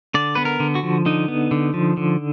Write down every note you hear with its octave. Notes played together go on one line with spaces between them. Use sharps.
D3 D5
B3 B4
A#4
D3
F#4
F3
D3 D#4
B3
D3
F3
D3